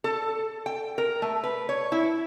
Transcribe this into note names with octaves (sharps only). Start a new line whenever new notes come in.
A4
G5
A#4
A3
B4
C#5
E4